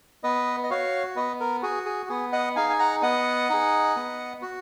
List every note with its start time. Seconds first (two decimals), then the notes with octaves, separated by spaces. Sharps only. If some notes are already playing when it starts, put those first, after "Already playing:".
0.23 B3 B4 D#5
0.63 D#5
0.70 F#4 C#5 F5
1.16 B3 B4 D#5
1.40 A#4
1.62 F#4 G#4
1.86 G#4
2.09 B3 G#4
2.32 D#5 F#5
2.56 D#4 G#4 F5 G#5
2.70 G#5
2.79 F#5 A#5
3.02 B3 D#5 F#5
3.50 D#4 G#4
3.96 B3
4.42 F#4